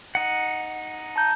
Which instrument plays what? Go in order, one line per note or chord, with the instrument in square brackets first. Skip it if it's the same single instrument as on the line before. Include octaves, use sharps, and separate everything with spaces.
[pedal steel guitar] D#4 F#5
[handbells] A5 A#5 G6